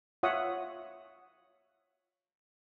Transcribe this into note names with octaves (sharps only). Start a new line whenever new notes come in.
F4 C#5 E5 F#5 D#6